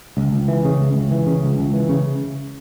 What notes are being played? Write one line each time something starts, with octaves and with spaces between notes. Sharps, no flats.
C#2
C#2
E3
C#3
C#2
C#2
E3
C#3
C#2
C#2
E3
C#3